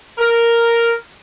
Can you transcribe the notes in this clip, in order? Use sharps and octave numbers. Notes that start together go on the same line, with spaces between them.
A#4